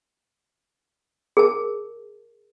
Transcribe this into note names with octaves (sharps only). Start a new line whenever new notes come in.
G#4 A#4 A5